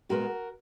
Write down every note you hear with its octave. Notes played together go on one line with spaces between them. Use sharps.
A#2 G#3 B3 F#4 A#4